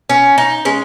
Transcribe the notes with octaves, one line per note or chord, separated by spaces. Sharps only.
C#4
D#4
G#3 C#4